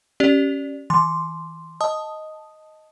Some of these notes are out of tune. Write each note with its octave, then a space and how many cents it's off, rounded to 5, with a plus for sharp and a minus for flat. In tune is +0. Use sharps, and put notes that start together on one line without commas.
C#4 +0 G4 -20 D5 +0
E3 -25 C6 +0
D#5 +5 A5 +0 D#6 +0